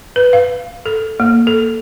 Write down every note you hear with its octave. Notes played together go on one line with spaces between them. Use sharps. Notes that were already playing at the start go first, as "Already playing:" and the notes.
B4
F5
A4
A#3
A4